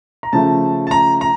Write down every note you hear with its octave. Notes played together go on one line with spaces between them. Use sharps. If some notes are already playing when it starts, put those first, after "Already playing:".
A#5
C#3 F3 A3 A5
A5
A#5
A#5